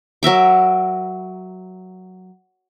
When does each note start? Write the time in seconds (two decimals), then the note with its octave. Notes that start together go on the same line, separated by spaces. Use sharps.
0.23 F#3 A#4 E5 D6